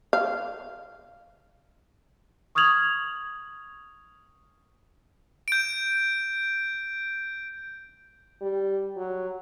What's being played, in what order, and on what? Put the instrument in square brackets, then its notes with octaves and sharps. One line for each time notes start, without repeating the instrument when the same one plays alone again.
[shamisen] F5
[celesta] C#6 D#6 F6 G#6 F7 F#7
[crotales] G6 D7
[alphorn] G3
F#3